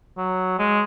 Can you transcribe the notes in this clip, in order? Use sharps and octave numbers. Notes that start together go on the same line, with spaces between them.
F#3
G#3